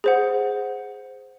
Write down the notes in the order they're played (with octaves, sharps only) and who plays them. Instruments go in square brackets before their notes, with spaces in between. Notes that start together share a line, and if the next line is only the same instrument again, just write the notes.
[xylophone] G#4 C5 F#5